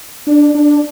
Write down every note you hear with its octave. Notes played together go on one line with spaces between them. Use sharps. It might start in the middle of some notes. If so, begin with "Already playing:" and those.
D4
D4